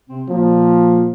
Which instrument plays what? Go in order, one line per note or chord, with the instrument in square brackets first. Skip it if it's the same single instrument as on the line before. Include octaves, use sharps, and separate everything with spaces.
[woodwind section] C3 C4
[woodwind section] A#2 A#3 [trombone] F3